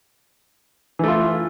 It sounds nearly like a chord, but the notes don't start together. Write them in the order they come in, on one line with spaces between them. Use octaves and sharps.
E3 A3 F4